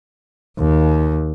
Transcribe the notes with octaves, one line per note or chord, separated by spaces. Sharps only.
D#2